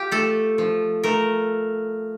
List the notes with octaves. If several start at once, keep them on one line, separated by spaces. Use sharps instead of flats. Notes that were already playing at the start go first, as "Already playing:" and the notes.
Already playing: F4 G4
A3 A4
F3
A3 A#4